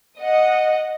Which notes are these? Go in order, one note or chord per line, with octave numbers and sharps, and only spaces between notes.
D#5 F#5